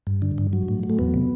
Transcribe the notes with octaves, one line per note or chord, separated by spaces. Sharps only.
G2
D3
G2
F#3
A2
F#3
A3
E2 B3
C3